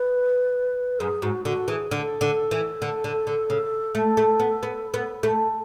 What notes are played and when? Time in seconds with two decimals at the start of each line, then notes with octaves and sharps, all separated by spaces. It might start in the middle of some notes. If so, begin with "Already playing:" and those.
Already playing: B4
1.00 F#2 G#4
1.22 G#2 F#4
1.45 D3 F#4
1.68 E3 G#4
1.91 D3 A4
2.21 D3
2.51 E3
2.82 D3
3.04 D3
3.27 D3
3.50 C#3
3.95 A3
4.17 A3
4.40 B3
4.63 B3
4.94 B3
5.23 A3